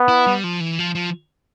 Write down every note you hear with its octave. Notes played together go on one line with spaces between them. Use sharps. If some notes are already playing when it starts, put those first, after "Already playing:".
Already playing: B3
E4
G3
F3
E3
F3
F3